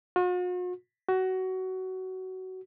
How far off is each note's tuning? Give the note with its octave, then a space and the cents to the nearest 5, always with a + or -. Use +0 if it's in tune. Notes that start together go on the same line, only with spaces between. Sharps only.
F#4 -45
F#4 +20